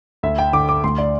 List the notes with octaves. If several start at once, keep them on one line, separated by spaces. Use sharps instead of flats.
D2 E5
G5
D3 D6
D6
D2 C6
D5